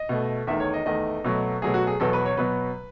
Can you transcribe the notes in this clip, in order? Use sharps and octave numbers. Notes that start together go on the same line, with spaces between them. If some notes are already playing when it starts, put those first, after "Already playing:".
Already playing: D#5
B2 A3
E2 D#3 A3 E5
C#5
D#5
E2 D#3 A3 D#5
B2 F#3 A3
B2 F#3 A3 G#4
F#4
G#4
E2 B2 F#3 B3 A4
B4
C#5
B2 F#3 B3 B4